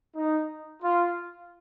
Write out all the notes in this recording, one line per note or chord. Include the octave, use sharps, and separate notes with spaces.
D#4
F4